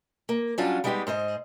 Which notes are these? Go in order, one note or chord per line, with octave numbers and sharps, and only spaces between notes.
A#3
F#3 G3 C#4 D4 F4
G3 G#3 B3 D#4 G4
G#2 C5 D#5